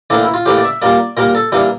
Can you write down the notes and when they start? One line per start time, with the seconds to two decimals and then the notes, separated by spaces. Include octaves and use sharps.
0.10 A2 E3 A#3 D4
0.23 E4
0.34 F4
0.46 A2 E3 A#3 G4
0.58 D5
0.64 E5
0.82 A#2 G3 A#3 D5
1.17 A#2 G3 A#3 A#4
1.35 A4
1.52 E3 G3 A#3 D4